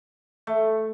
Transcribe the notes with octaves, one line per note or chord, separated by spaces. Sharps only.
A3